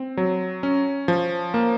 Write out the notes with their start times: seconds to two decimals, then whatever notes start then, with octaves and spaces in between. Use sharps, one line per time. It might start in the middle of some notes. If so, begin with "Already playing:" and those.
Already playing: C4
0.17 F#3
0.63 C#4
1.08 F3
1.54 A#3